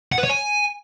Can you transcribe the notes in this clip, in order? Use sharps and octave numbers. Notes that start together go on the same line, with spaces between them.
F#5
B4
C#5
G#5